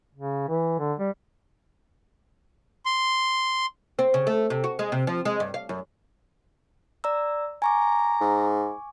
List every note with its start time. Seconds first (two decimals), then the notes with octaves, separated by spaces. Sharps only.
0.15 C#3
0.48 E3
0.79 D3
0.99 G3
2.86 C6
3.99 C4
4.14 C#3
4.27 A3
4.50 C3
4.64 F#4
4.79 G#3
4.92 C3
5.07 F3
5.25 G#3
5.40 G2
5.54 F5
5.69 F#2
7.04 D5 A#5 E6
7.62 G#5 A#5 C#6 D6
8.21 G#2